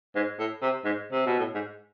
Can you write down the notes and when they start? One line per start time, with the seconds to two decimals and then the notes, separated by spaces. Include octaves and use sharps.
0.15 G#2
0.39 A2
0.62 C3
0.85 G#2
1.12 C3
1.26 B2
1.39 A2
1.54 G#2